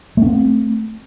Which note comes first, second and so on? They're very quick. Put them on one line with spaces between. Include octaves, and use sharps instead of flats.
A3 C#4 C4